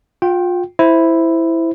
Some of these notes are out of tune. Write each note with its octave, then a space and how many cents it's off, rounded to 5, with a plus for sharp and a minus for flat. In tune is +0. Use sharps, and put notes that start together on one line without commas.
F4 +30 G5 -10
E4 +0 C5 -5